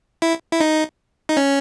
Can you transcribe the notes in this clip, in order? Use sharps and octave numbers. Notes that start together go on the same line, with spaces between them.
E4
E4
D#4
D#4
C#4